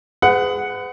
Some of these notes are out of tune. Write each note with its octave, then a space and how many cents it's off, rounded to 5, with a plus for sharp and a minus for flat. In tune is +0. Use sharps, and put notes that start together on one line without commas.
G#4 +0 B4 +40 F#5 +0